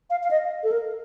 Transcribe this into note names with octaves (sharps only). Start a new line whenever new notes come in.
F5
F5
D#5
A4
A#4